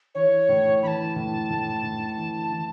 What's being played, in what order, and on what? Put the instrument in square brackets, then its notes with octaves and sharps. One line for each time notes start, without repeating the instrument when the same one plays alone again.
[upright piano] E3 [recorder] C#5
[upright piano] A2
[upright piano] E3 [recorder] B5
[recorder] A5
[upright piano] A2
A2
A2
E3
E3